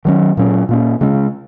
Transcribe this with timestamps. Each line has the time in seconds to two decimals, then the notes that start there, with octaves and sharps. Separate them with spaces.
0.05 D#3 F#3 C#4
0.37 A#2 F#3 C#4
0.69 A#2 A#3 C#4
1.01 C#3 G#3 C#4